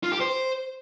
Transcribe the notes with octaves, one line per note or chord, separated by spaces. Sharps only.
F4
G4
C5